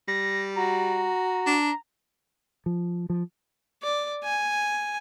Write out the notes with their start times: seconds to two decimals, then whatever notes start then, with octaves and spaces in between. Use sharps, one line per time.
0.08 G3 A#6
0.56 F#4 A#5
1.46 D4
2.66 F3
3.10 F3
3.83 D5
4.23 G#5